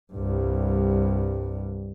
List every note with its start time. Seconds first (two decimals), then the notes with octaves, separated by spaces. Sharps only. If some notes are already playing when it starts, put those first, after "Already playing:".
0.13 C2 G2